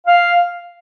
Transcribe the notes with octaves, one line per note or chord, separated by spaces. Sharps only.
F5